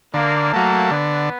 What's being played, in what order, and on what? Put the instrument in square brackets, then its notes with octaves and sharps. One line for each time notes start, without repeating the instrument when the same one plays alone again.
[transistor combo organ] D3 [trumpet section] A#3
[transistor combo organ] F#3 A3 [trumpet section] A#3
[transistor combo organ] D3 [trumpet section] B3